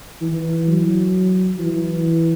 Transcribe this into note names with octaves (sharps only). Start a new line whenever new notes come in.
E3
F#3
E3